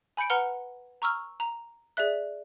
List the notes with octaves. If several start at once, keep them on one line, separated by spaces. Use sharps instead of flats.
G#5 B5 G6 C#7 D7
B4 F#5 A#5 F6 C#7 G7
A#5 C#6 E6 F6
A#5
G#4 D5 E5 F#6